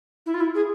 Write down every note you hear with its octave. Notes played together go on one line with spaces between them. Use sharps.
E4
F4
E4
G#4